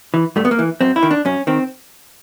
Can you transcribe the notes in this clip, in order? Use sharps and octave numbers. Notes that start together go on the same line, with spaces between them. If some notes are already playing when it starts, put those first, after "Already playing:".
E3
G2 A3
B3
A#3
E3
F#2 C4
E4
D#3
D4
F#2 C#4
D#3 C4